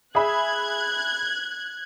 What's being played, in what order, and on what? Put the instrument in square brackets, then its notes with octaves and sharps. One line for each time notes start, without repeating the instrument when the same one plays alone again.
[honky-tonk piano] G#4 E5 B5 [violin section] F#6 G#6